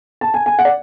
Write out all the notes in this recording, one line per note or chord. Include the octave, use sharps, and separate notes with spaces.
A5
G#5
G#5
F#5
D5